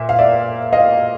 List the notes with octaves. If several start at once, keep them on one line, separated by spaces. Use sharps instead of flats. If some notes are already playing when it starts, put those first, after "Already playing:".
Already playing: A#2 E5
F5
D5 E5
D#5 F5